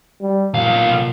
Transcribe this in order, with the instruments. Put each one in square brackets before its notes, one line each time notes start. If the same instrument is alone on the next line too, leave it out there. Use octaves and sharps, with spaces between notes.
[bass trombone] G3
[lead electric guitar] B1 F5 [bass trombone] A#2